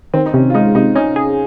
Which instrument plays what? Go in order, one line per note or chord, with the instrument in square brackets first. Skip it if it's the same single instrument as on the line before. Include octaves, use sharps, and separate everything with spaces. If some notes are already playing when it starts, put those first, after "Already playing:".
[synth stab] D#3 [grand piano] C4
[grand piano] D#4
[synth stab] C3 [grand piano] C#4
[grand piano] F4
[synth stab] G#3 [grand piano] D#4
[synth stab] C3 [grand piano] D#4
[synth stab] C#4 [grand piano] D#4
[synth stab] G#4